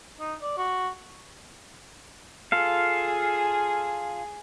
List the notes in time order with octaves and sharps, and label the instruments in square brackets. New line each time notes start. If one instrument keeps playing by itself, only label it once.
[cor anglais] D#4
D5
F#4
[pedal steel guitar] F4 A4 F5 [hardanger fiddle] G#4